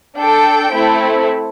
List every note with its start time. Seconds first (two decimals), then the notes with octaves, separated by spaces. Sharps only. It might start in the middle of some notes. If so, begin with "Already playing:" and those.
0.17 D4 A4 G5
0.71 A3 C4 E4 A4